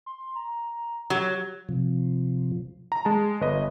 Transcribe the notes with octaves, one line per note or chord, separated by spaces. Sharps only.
C6
A#5
F#3 G4
C3 F3
A#5
G#3 A5
G1 B4 D#5